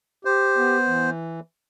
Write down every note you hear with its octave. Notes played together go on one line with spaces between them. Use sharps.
G4 C5
B3
E3